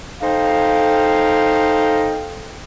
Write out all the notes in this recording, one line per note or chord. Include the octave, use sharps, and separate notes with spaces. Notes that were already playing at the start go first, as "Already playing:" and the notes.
D#4 A4 C5 F5 G5